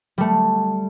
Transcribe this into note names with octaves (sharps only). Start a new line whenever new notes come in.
G3 A3